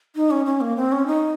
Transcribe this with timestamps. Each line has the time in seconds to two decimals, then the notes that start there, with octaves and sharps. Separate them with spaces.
0.16 D#4
0.31 C#4
0.46 C#4
0.61 A#3
0.76 C4
0.92 C#4
1.07 D#4